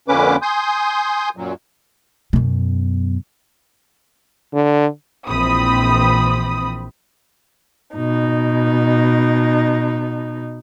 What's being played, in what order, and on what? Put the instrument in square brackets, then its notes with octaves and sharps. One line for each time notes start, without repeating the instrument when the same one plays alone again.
[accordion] F2 D3 A#3 C#4 B4 D6
G#5 C6 D#6 G6
F#2 A#2 F#3
[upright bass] F#2 B2
[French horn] D3
[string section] A#1 E3 C4 B5 D#6
[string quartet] B2 D#4